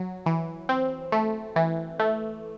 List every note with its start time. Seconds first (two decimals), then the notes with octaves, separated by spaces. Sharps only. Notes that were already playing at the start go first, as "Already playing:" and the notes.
Already playing: F#3
0.26 E3
0.69 C4
1.12 A3
1.56 E3
1.99 A3